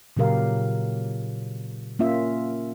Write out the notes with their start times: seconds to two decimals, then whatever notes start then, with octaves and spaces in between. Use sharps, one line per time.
0.17 A#2 C#3 F#3 G4 A#4 F5
1.99 A#3 C#4 F4 E5